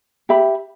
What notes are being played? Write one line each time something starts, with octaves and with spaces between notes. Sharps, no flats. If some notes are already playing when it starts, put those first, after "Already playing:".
G4 E5 B5